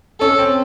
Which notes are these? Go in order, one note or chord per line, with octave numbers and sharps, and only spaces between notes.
C#4 A4
C4